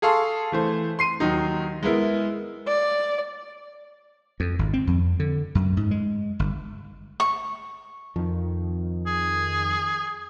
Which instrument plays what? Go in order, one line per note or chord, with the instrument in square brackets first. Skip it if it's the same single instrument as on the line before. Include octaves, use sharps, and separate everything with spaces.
[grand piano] G#4 A4 F5 C6 C#6
E3 A3 C5
C6 C7 D#7
D#2 F#3 D#4
G#3 B3 E4 A#4
[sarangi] D5
[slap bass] F2
G#1
C4
F2
D3
F#2
G#2
G#3
G1
[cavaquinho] C#6
[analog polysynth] F2 D#3 [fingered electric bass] F3
[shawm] G#4